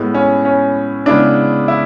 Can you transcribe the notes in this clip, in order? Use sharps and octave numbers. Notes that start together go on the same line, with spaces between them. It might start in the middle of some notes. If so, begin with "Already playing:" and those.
Already playing: A2 G#3 B3
C#4
C#4
C#3 G#3 B3 D4 E4 G#4
E4